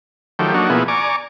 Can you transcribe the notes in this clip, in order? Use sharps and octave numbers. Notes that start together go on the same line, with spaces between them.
D#3 F3 F#3 A3 G4
F#3 A#3 D4 D#4 F#4
B2 F3 A#3 B3 E4 G#4
D5 G#5 A#5 C#6 D6